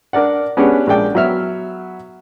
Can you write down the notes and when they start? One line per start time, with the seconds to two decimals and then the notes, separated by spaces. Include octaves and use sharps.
0.13 D4 A#4 D5 F#5
0.57 B3 C#4 D4 G4 G#4 B4
0.87 A#1 G#3 D5 G5
1.15 F#3 B3 E5 F6